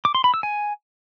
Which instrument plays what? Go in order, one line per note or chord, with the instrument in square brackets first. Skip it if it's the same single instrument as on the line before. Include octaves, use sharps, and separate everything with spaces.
[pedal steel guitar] D6
C6
B5
E6
G#5